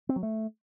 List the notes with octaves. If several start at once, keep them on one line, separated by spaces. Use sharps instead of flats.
C4
F#3
A3